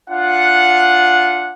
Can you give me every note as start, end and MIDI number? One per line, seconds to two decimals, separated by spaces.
0.10 1.53 62
0.10 1.53 65
0.10 1.53 78